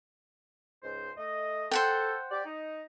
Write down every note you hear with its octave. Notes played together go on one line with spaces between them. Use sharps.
C#2 G#2 C5
A3 D#5
A4 C5 F#5 G5
G4 D5
D#4